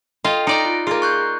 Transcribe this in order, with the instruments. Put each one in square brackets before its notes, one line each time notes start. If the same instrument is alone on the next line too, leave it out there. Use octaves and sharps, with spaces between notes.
[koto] F4 [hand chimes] A4 D#5 G5
[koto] D#4 D5 A#5 [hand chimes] D7
[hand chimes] F4
[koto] A#3 F4 [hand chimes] G#4
[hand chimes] C#6 F#6 G6